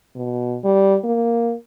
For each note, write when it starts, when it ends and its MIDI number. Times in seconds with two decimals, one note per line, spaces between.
0.16 0.57 47
0.64 0.96 55
1.04 1.53 58